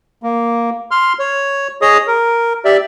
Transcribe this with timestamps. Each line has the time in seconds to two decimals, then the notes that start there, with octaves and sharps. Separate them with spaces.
0.23 A#3
0.91 C6 F6
1.19 C#5
1.82 G#4 C#5 D#5 D#6
2.07 A#4
2.65 G4 D5 E5